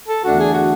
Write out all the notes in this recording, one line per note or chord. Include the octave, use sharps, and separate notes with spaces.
A4
E2 D3 A3 D4 F#4
G#4
F#4